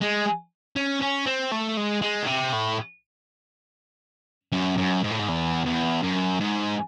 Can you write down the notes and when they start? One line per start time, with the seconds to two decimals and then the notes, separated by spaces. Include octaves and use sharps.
0.02 G#3
0.76 C#4
1.02 C#4
1.26 C4
1.52 A3
1.77 G#3
2.02 G#3
2.23 A2
2.27 C3
2.53 A2
4.52 F#2
4.77 F#2
5.03 G#2
5.11 A2
5.19 G#2
5.28 E2
5.65 E2
6.03 F#2
6.40 G#2